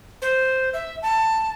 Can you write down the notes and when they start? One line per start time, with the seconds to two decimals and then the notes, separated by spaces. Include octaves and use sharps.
0.22 C5
0.73 E5
1.02 A5